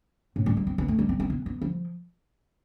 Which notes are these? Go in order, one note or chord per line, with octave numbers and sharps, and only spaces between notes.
A2
G3
G3
C4
B3
A3
G3
C4
C4
B3
B3
F3